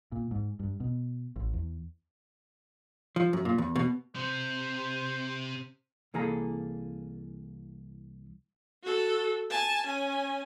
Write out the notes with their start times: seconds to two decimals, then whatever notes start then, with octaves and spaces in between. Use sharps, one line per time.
0.12 A#2
0.31 G#2
0.59 G2
0.80 B2
1.36 A1
1.53 E2
3.16 F3
3.33 F#2
3.45 A#2
3.58 E2
3.76 B2
4.16 C3 C5
6.14 C2 E3 A#3 G#4 A4 A#5
8.83 F#4 A4
9.51 G#5 A5
9.86 C#4 G#5